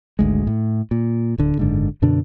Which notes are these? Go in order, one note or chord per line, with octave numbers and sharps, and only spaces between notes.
G#1 D2 G#3
A2
A#2
D1 D3
F#1 G#2 D3
F#2 B2 D3 D4